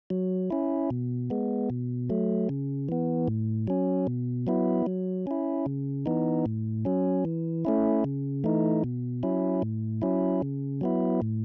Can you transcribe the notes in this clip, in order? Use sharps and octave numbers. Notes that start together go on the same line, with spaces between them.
F#3
C#4 E4
B2
G#3 B3
B2
F#3 A3
C#3
E3 B3
A2
F#3 C#4
B2
F#3 B3 E4
F#3
C#4 E4
C#3
E3 B3 D#4
A2
F#3 C#4
E3
A3 C#4 E4
C#3
E3 A3 D#4
B2
F#3 C#4 E4
A2
F#3 C#4 E4
C#3
F#3 B3 E4
A2